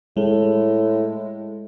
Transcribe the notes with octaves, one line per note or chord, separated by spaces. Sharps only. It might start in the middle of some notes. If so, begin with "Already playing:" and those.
A2 G#3